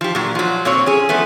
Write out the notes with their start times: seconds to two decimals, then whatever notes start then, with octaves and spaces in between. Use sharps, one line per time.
0.01 F3 G4
0.15 A#2 F#3
0.35 F3 F#3
0.65 A#2 C4 C#5
0.86 C#4 G#4
1.09 F3 A3 B3